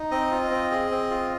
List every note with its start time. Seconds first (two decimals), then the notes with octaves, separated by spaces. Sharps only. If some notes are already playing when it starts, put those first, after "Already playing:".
Already playing: D#4
0.11 C4 D#5
0.31 F4
0.51 C4
0.71 G#4
0.91 C4
1.11 F4